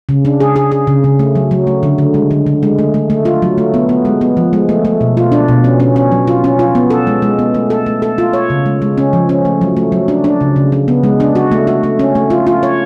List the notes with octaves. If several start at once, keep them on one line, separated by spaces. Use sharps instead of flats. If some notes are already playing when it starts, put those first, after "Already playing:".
C#3
D4
G#4
G#4
G#4
C#3
C#3
A3
F#3
F#3
A3
D3
D3
G#3
D3
D3
G#3
A3
A3
A3
F4
F#3
A3
B3
B3
G#3
B3
F3
G#3
A3
A3
B2
F4
D4
B2
C#4
C#4
C#4
F#3
F4
C#4
F4
B3
A4
G#3
G#3
B3
A3
A4
A3
A4
F4
C#5
C#3
G#3
G#3
C#4
F3
C#4
A3
F#3
A3
F#3
D4
D4
C#3
C#3
D4
B3
G#3
D4
F#4
A3
F#4
A3
C#4
A3
F4
F4
C#5